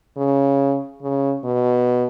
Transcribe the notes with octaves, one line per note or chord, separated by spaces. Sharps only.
C#3
C#3
B2